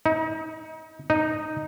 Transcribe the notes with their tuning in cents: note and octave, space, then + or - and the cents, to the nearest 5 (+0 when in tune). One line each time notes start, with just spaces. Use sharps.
D#4 +35
D#4 -5